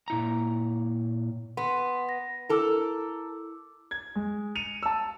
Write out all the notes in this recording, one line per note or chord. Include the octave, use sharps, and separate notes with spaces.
A#2 E4 A#5
B3 C6
A#6
E4 A4 A#4 D6 E6
G#6
G#3
C#7 D#7 F7
A5 E6